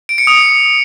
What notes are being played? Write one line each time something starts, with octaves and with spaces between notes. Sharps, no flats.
D7
C#7
D#6